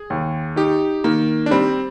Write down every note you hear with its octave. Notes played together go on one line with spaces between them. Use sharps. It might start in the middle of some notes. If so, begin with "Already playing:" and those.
Already playing: G#4
D#2
D#4 G4
D#3 A#3
D4
G3 C4